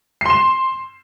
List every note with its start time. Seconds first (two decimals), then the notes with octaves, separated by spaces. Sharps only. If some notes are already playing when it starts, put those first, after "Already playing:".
0.21 C7
0.26 C6
0.30 E7